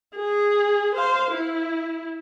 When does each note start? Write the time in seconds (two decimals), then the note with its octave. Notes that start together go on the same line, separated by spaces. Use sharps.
0.16 G#4
0.95 C5 F5
1.31 E4